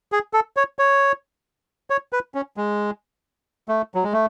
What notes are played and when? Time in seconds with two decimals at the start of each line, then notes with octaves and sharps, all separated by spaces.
0.12 G#4
0.33 A4
0.57 C#5
0.79 C#5
1.90 C#5
2.13 B4
2.35 C#4
2.57 G#3
3.69 A3
3.95 F#3
4.04 G#3
4.13 A3